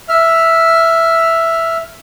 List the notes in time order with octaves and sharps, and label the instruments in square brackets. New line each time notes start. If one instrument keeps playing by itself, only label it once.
[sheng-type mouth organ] E5 F6